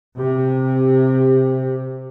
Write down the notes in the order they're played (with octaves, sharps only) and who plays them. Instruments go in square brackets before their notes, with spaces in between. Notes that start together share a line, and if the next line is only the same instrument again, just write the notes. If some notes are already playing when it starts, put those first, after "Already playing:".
[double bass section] C3 [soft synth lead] G4